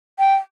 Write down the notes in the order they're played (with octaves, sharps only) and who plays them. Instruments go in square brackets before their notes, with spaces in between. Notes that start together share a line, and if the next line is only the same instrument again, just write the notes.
[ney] G5